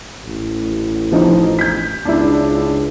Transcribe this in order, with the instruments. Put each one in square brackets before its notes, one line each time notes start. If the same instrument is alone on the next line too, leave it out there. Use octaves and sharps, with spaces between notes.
[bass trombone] A1
[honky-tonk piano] E3 F3 D#4
G6 B6
[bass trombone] C#2 [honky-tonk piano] D4 E4